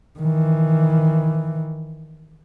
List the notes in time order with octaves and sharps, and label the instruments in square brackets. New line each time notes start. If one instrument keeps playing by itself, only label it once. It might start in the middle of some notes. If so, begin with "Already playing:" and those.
[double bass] D#3 E3